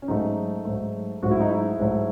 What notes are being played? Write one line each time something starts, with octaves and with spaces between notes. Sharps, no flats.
C#4
G#2 F#3 A3 D#4
G#2 F#3 A3
G#2 F#3 A3 F#4
E4
D#4
E4
G#2 F#3 A3